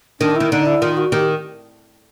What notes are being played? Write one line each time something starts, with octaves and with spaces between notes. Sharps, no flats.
D#3 D4
D#3 E4
D3 D#4
E4
D#3 F4
F#4
D#3 G4